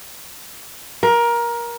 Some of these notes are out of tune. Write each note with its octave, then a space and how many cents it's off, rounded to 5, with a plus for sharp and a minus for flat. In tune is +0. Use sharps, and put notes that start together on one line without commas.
A#4 +20